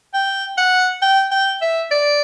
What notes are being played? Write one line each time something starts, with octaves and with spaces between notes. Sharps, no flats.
G5
F#5
G5
G5
E5
D5